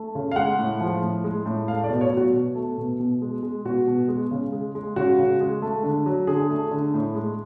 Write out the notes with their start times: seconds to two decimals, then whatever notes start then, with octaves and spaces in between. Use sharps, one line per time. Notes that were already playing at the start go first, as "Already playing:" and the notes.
Already playing: A3
0.15 C#3
0.31 F5
0.36 G#3 F#5
0.59 A2
0.80 F3
1.02 A2
1.24 G#3
1.46 A2
1.68 A3 F5
1.84 D5
1.90 B2
2.01 C#5
2.12 F#3
2.17 F#4
2.33 B2
2.55 A3
2.78 B2
3.00 B2
3.21 G#3
3.43 G#3
3.65 B2 F#4
3.87 B2
4.08 G#3
4.31 C#3
4.52 G#3
4.75 G#3
4.96 C#3 F#4
5.19 C#3
5.40 G#3
5.62 A3
5.83 D3
6.06 F#3
6.27 D3 G#4
6.50 A3
6.71 D3
6.94 A2
7.15 G#3